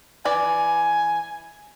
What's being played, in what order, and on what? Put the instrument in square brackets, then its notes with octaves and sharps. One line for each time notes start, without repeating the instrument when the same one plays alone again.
[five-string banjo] E3 B4 D5 [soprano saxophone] G#5